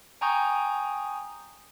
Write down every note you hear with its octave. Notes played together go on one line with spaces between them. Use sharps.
G5 G#5 A#5 C#6 D#6 G6